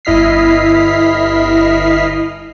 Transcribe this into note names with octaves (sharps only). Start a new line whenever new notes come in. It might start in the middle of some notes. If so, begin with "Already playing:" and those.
G1 E4 D#5 F6 B6 C7